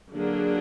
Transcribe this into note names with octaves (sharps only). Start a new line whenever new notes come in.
D3 F#3 A#3 D4 G#4